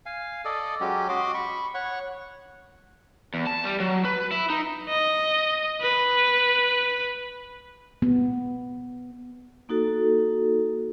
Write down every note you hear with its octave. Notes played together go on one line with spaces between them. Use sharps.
F5 G#5
A4 D5 D#5
F#3 G#3 C#4 G4
F#4 D#5 C6 D6
B5 C#6
C#5 F#5 C#6
E2
A5
G3
F#3
B4
E4
D#4
D#5
B4
B3
A#3 D#4 F#4 A4